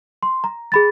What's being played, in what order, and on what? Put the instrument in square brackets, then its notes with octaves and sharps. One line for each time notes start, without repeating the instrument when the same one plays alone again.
[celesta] C6
A#5
G#4 B5 A6